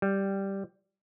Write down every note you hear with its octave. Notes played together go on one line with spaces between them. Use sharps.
G3